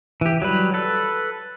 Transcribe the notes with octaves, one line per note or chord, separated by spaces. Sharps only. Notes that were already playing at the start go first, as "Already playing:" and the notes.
E3 G4
F#3 G3 B4
A4 B4